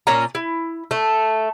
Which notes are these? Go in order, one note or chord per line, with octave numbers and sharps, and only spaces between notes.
A#2 C#4 C#5 A#5
E4
A3